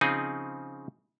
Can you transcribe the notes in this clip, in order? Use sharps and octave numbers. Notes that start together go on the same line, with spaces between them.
C#3 F3 C4 D#4 G#4